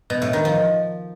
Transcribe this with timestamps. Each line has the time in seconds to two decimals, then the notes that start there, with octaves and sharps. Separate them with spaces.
0.10 B2
0.22 A2
0.33 D#3
0.45 F3